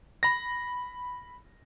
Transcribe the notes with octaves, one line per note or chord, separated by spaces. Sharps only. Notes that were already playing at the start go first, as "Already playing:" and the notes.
B5 A#6